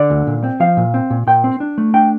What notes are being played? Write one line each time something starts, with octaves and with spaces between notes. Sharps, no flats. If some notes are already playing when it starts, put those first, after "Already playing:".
Already playing: D3 D5
D2
A#2
C4
F3 F5
A#2
C4
A#2
A#2 G5
C4
D4
A3
D4 G5